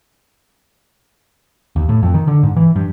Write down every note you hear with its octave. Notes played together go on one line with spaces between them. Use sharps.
D#2
A2
F2
D#3
D3
G#2
E3
G2